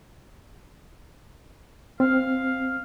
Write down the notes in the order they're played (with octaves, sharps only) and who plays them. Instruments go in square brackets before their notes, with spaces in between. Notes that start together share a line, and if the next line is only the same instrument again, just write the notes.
[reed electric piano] C4 [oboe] F5